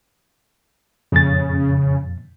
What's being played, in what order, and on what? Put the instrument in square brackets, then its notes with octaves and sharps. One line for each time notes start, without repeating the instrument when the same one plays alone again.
[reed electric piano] F2 A#2 A6 [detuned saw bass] C#3